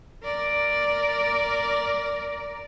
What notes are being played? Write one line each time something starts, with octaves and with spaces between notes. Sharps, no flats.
A#4 D5